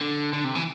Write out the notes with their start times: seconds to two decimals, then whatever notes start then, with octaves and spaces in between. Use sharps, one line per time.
0.01 D3
0.33 D3
0.44 C3
0.55 E3